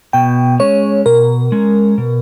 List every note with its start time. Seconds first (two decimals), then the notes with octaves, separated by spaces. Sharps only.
0.13 B2 G5
0.60 G#3 C#4 C#5
1.06 B2 A#4
1.52 G#3 C#4
1.98 B2